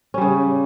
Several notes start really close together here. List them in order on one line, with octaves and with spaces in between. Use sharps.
C#4 G3 C#3